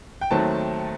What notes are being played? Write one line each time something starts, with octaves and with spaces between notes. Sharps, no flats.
G5
D#2 D#3 F#3 A3 C4 A5